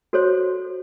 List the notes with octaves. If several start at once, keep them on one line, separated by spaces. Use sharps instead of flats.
F#4 A4 C5 C#5 C6